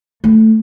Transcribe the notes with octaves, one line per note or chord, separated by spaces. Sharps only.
A3